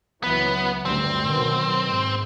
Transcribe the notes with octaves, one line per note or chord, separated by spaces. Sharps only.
C#2 E3 F#3 B3
D2 G2 G3 C4
B2 D#3 F#3
G#2